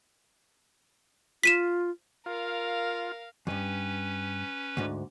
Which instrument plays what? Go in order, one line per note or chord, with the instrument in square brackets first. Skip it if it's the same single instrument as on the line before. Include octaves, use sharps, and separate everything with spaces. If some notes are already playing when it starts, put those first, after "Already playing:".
[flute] F4 [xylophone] B6 D#7 E7
[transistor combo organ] F4 [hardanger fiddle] A#4 F5
[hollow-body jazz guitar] E2 G2 [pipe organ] C#4 B4
[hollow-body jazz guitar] D2 G#2 D3